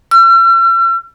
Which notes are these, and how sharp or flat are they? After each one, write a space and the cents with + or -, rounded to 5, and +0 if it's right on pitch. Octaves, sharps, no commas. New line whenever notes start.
E6 +45